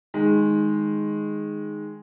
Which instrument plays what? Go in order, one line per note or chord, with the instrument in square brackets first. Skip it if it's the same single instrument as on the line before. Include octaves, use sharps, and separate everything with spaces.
[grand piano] D#3 G#3